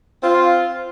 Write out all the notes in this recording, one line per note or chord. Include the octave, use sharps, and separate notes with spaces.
C4 F4